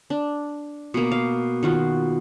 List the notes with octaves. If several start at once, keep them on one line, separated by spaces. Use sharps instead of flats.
D4
B2 A#3
F5
D#3 F4 F#4